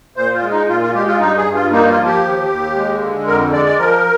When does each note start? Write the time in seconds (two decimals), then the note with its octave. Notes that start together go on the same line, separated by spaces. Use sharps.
0.16 A#2 C5
0.34 F4
0.43 G#3
0.51 D#4
0.68 A#2 F4
0.82 F4
0.94 G#3 G4
1.07 F4
1.20 G2 D#4
1.37 G#4
1.46 G2
1.54 F4
1.72 A#3 D#4
1.89 F4
1.98 F3
2.06 G4
2.24 D#2
2.49 D#2
2.76 G#3
3.01 D3
3.27 F2 A#4
3.53 G#3 D5
3.65 D5
3.78 F3 A#4